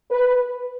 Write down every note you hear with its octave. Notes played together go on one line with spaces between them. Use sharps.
B4